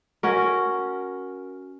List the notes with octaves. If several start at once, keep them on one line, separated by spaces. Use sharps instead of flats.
C#4 F#4 A#4